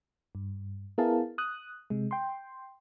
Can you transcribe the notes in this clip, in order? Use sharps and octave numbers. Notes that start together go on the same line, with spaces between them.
G2
B3 E4 G#4 A#4 F5 A5
D#6 F#6
C3 G#3
G5 C6